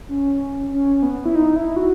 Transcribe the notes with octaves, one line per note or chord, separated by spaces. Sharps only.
C#4
C#4
B3
E4
D#4
E4
F#4